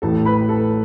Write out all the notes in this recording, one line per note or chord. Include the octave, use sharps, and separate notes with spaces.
A1 A2 E3 A4 A5
B4 B5
A4 A5